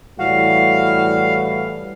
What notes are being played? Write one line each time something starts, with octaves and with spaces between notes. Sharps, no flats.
A2 E3 G3 F#4 F5